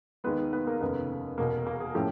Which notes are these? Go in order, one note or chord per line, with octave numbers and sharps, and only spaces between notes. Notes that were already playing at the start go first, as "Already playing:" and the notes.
D#2 D#3 G#3 B3 B4
B3 B4
A#3 A#4
F1 D#2 C#3 B3 B4
E1 E2 B2 A#3 A#4
A#3 A#4
G#4
A2 F3 A3 C#4 E4 G4